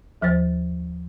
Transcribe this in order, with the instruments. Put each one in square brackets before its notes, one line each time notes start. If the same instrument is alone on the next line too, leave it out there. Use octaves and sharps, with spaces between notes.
[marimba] D#2 F3 C5 A6